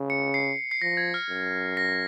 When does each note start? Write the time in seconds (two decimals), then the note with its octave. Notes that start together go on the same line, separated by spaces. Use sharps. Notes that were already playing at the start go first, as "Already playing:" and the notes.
Already playing: C#3
0.10 C#7
0.34 C7
0.71 C7
0.81 F3 A#6
0.97 G#6
1.14 F6
1.29 F#2
1.77 A#6